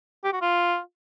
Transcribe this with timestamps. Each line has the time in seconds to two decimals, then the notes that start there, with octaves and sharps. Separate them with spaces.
0.24 G4
0.33 F#4
0.42 F4